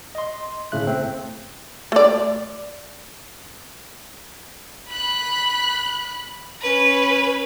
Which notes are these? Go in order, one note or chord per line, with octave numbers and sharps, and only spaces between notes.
D#5 C6
G1 A2 C#3 E5 F#6
A3 C4
A3 D5
B5 F#6
C#4 B4